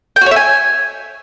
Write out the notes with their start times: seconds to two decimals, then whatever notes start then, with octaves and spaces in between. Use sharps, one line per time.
0.16 G5
0.21 F#4
0.26 C#5
0.31 E5
0.36 G#5